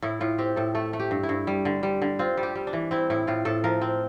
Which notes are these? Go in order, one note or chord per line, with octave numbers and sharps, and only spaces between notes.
A2 E4
A2 F4
C4 G4
A2 A4
A3 A4
A3
G4
G2
E4
G2
G3
D3
G3
D3
C4 F4
G3
G4
G3
D4
E3
C4 E4
A2 E4
A2 F4
A2 A4
F3 A#4
C4